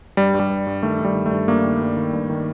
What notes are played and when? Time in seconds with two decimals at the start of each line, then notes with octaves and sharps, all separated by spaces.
0.17 G2 G3
0.34 G2
0.40 G3
0.50 G2
0.67 G2
0.83 D#3 A3
0.99 D#3
1.05 G3
1.15 D#3
1.26 A3
1.31 G2
1.48 G2 A#3
1.64 D#3
1.81 G2
1.97 D#3
2.13 G2
2.30 D#3